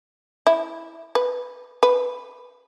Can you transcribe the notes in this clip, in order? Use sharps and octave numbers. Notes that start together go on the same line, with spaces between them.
E4
B4
B4